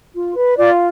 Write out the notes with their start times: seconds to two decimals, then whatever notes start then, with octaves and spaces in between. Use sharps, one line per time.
0.14 F4
0.35 B4
0.58 F4 D5